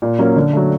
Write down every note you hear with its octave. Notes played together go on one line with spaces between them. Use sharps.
A#2
F#3 A#3 C#4
D3
F#3 A3